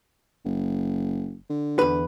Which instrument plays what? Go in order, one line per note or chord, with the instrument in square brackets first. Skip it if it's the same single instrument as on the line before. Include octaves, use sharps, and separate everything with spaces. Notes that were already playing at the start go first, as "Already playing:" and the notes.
[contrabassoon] F#1
D3
[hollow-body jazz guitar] E2 B4